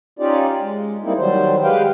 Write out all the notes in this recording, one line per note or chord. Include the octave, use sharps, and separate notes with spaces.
C#4 D#4 F4 G4 D5
G#3
G3 A#3 C4 D#4 E4
D#3 F#3 G3 C5
G#3 G4 B4 F5 G5